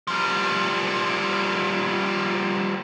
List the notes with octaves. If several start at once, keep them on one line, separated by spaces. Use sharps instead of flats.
F3 G3